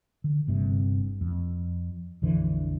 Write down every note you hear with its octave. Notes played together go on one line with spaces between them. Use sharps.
D3
G1 G2 C3 C4
F2
A#1 F2 D3 E3